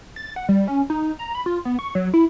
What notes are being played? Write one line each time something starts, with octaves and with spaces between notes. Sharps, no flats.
A6
F#5
G3
C#4
D#4
A#5
B5
F4
B3
C#6
F#3
E4